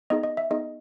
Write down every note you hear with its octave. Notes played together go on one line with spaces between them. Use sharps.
B3 D#4 G#4 D#5
D#5
E5
B3 D#4 G#4 D#5